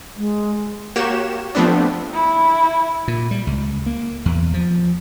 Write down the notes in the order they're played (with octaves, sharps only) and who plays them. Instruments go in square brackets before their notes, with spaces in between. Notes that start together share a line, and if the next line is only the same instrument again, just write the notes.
[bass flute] G#3
[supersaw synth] A#3 F#4 G4 C#5 E7
F3 A3 B3 C4 D4
[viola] E4
[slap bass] A#2
G3
C#2
A#3
E2
F3